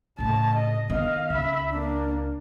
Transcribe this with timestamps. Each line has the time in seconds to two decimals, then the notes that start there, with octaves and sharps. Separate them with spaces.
0.18 A2 C#3 A5
0.56 D#5
0.90 D#3 B3 D#5 F5
1.30 C#2 E5 B5
1.71 A#3 D4